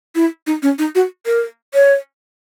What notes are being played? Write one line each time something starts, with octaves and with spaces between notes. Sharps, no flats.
E4
D#4
C#4
D#4
F#4
A#4
C#5